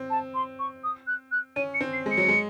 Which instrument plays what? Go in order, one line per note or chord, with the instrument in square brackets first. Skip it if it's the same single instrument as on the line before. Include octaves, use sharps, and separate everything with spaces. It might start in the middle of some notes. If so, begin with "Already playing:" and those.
Already playing: [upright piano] C4
[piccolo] A5
C6
C#6
D#6
F#6
F#6
[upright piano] C#4 [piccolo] D#7
[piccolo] C#7
[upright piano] C4
[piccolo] C7
[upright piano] G#3
[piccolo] C#7
[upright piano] F#3
G#3